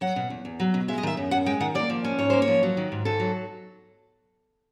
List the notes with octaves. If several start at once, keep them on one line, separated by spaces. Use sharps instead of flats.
F#3 F#5
B2
E2
E2
F#3
B2
G#3 E5
D#5
D#3 E5
F#2
F#2 F#5
G#3 G5
D#3 F#5
A#3 D5
F3
C#4
G#2 C#5
A#3 C5
C#5
F3
F#3
D#3
G#2
G#2 A4
F#3